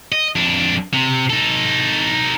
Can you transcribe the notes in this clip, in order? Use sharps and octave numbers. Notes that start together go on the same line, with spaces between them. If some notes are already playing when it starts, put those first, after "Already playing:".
D#5
F2 D4
C3
D#4 A4